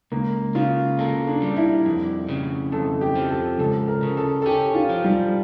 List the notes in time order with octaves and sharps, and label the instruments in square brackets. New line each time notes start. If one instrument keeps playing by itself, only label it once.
[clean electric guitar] C#2 [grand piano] A#3
[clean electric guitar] C#3 [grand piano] F4
[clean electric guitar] A#3 [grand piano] A4
[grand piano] D4
[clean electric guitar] G3
[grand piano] E4
[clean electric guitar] F2
C#3
[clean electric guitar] F2 [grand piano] A4
[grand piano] G4
[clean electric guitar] F3
[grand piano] A4
[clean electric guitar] C#2 [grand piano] A4
[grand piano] A#4
[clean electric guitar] C#3
[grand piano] A4
A4
[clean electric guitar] C#4 [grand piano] G4
[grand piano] F4
[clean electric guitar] F3
[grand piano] G3